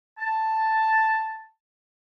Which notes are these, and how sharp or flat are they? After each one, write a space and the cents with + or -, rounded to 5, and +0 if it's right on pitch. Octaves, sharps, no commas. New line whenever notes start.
A5 +5